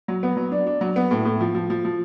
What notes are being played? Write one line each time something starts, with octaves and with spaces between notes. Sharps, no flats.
F#3
B3
F#3
D4
D4
F#3
B3
A2
A2
F3
F3
F3
F3